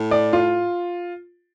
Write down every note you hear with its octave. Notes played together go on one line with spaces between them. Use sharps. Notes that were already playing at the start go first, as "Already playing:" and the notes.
Already playing: A2
D5
F4